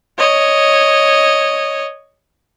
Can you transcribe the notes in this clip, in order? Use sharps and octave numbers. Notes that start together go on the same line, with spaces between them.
C#5 D#5